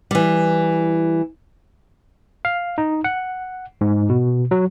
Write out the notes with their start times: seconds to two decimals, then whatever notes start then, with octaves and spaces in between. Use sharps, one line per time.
0.11 E3 G3
2.45 F5
2.78 D#4
3.04 F#5
3.81 G#2
4.09 B2
4.51 F#3